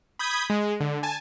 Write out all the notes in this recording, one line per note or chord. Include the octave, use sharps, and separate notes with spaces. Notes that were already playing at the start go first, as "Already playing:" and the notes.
B5 D#6 G6 G#6 B6
G#3
D3
G#5 A5